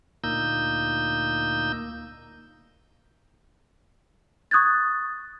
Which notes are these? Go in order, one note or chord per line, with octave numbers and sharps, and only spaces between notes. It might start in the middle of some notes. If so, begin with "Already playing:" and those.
D2 A#2 A#3 D#4 E6 G6
C#6 D#6 F#6 G#6 A6